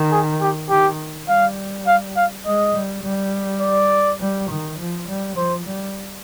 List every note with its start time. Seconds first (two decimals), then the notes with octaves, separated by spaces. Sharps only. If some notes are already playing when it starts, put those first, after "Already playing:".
Already playing: D#3
0.12 G#4
0.42 G4
0.70 D#3 G4
1.28 G3 F5
1.87 F5
2.17 F5
2.45 G#3 D#5
2.75 G3
3.04 G3
3.61 D5
4.20 G3
4.50 D#3
4.79 F3
5.08 G3
5.36 F3 C5
5.66 G3